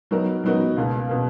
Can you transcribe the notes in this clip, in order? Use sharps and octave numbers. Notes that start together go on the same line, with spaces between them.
F#3 B3 D#4 F#4 A#4
F#3 B3 D#4 F#4 A#4
C#2 B2 A#3
B2 A#3